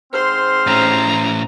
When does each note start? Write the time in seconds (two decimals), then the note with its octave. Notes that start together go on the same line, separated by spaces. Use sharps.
0.13 G#2 C4 C5 C6 F6
0.67 A2 C#4 A#5